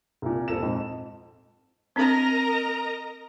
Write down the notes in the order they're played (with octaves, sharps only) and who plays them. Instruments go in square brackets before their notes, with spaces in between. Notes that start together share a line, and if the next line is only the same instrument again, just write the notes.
[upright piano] C2 A#2
D#1 A4 E7
F2 G#2
[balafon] C4 D4 [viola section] A#4 D#5 A#5